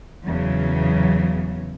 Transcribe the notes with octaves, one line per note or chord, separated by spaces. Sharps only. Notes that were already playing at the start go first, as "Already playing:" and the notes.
E2 C#3 F#3